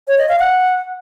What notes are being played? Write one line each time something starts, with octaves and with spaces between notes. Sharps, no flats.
C#5
D#5
F5
F#5